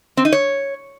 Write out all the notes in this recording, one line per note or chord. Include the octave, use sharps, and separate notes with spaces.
C4
D#4
C#5